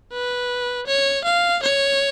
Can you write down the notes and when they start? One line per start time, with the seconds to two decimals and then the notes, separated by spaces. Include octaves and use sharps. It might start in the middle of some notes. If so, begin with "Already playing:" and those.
0.13 B4
0.87 C#5
1.25 F5
1.63 C#5